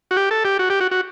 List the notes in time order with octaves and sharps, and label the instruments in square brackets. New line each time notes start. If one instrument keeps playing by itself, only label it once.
[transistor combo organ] F#4
G4
A4
G4
F#4
G4
F#4
F#4